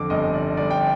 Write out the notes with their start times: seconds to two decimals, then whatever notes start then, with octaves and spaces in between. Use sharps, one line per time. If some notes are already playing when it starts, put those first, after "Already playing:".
Already playing: F2 D3 D6
0.10 G1 D#5
0.34 D5
0.57 G1 D5
0.71 G5